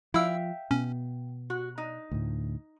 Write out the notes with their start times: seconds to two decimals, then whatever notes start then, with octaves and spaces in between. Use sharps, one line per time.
0.14 F3 E4 E5 F5 G5 E6
0.71 B2 B3 C#4
1.50 F#4
1.78 D#4
2.11 D2 A2